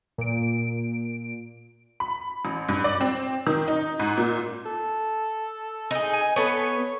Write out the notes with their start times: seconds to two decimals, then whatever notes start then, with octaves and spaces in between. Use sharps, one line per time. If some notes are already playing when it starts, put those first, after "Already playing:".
0.18 A#2 D7
2.00 B5
2.45 A1
2.69 G2
2.84 D5
3.01 C4
3.47 D#3
3.68 D#4
4.00 G#2
4.17 A#2
4.65 A4
5.91 D#4 G#4
6.13 G#5
6.36 B3 A4 B4 C#5